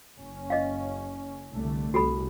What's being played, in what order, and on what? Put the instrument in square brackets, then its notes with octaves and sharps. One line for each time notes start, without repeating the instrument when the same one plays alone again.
[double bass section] F#1 C#4
[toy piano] D#5 F5
[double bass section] C2 D3 A3
[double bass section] C2 [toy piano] F#4 A4 B5